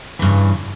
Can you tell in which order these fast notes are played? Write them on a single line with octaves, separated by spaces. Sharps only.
E3 G2 C#3